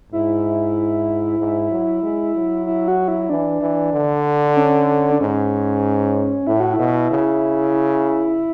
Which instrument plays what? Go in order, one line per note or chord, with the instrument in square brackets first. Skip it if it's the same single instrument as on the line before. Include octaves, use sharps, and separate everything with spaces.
[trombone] G#2 [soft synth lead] E4
[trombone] G#2
F#3
G#3
F#3
[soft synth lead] E4
F#4
E4
[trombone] E3 [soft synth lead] D4
[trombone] E3
D3
[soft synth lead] C#4
D4
[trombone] G#2 [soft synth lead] C#4
[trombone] A2 [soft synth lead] E4
[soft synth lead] F#4
E4
[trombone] B2
C#3